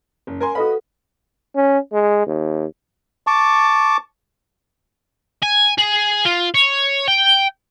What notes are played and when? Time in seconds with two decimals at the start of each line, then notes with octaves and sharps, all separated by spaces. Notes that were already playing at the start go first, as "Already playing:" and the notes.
0.27 F#1
0.40 A#4 G#5 C6
0.55 F#4 A4 B4 D#5 F5 B5
1.56 C#4
1.93 G#3
2.27 D#2
3.27 A5 C#6 D6
5.43 G#5
5.78 G#4
6.25 F4
6.54 C#5
7.08 G5